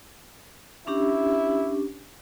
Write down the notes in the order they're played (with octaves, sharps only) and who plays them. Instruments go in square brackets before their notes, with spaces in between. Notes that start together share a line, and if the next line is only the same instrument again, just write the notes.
[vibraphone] C#4 D4 G4 [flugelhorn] E4